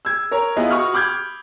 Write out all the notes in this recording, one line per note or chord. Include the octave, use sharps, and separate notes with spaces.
E6 G#6
A#4 C#5 A#5
B3 E4 F4 G#4 B4 D#5
F#4 B5 C#6 D#6 F6
B5 D6 F6 G6 G#6